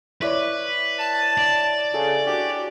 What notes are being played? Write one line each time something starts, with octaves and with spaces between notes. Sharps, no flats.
E4 B4 C#5 D5
A5
D5
C#3 G#4 A4
D4 F#4 G4